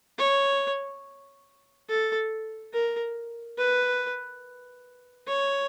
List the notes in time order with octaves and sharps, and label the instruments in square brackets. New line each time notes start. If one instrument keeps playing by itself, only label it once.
[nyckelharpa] C#5
A4
A#4
B4
C#5